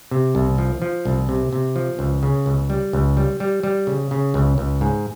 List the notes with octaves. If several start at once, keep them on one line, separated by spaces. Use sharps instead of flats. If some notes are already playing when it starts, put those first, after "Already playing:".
C3
C2
F3
F3
C2
C3
C3
F3
C#2
C#3
C#2
G3
C#2
G3
G3
G3
C#3
C#3
C#2
C#2
G#2